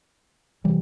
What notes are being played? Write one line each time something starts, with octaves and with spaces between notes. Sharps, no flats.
C3 E3 G3